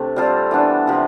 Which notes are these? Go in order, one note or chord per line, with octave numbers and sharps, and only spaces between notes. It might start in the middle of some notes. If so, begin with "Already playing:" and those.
Already playing: C3 A3 D4
G3 C4 F4 A4
E3 B3 D4
C3 F3 C4